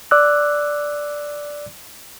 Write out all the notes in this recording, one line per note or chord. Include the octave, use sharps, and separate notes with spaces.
D5 D6 E6 F#6